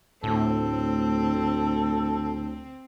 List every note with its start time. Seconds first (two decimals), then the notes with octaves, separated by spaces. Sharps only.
0.24 D2 A2 C4 A4